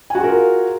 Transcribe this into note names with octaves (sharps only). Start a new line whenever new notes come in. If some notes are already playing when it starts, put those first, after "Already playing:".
F4 F#4 G#4 A#4 G#5